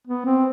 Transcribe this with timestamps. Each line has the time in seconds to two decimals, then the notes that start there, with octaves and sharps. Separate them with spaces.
0.08 B3
0.26 C4